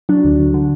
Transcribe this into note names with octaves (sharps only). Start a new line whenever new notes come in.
F#3 D4
D2
D2
D3